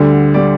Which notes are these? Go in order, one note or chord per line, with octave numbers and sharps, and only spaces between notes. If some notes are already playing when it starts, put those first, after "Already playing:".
Already playing: D2 D3 G3
D3 G3 D5